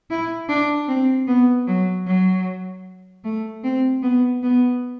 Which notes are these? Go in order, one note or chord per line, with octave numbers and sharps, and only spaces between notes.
E4
D4
C4
B3
F#3
F#3
A3
C4
B3
B3